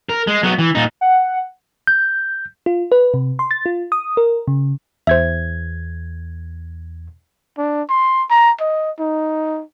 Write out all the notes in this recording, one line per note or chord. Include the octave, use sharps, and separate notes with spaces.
A#4
G#3
F#3 B3
E3
A#2 D#4
F#5
G6
F4
B4
C3
C6
A6
F4
D#6
A#4
C#3
E2 C5 E5 G#6
D4
C6
A#5
D#5
D#4